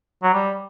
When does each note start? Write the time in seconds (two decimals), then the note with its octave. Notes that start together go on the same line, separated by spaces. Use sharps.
0.23 F#3
0.34 G3